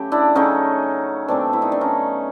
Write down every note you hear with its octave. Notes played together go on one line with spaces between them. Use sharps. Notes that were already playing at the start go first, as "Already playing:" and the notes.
Already playing: C#3 F#3 A3 G4
D4 E4
C#3 F#3 A3 C#4 D#4
B2 F#3 A3 C4 D4
E4
D#4
D4
C#4 D#4